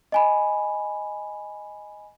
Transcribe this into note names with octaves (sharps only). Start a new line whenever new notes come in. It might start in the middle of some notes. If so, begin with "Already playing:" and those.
D#5 G#5 B5